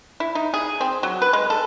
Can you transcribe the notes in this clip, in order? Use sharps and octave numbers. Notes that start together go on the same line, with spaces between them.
E4
D#4
G#4
C4
F#3
B4
G#3
A4